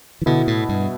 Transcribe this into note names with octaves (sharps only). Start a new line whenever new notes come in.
E3
B2 D3 B3 E4
A2
G2